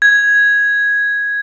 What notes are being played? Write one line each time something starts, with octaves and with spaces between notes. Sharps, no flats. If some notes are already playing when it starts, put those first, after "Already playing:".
G#6